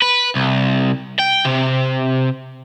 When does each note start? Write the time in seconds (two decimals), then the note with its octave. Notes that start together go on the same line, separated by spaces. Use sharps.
0.02 B4
0.35 C2
1.19 G5
1.45 C3